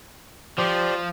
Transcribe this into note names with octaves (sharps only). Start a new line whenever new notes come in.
F3 G4 C5 D5